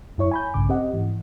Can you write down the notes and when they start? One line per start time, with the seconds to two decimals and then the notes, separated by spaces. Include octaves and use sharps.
0.18 F#2 E4 C#5 C#6
0.31 G#5 B5 G6
0.54 A#1 G2 C#3 D6
0.69 C4 G4 D#5 F#5
0.93 G#2 E3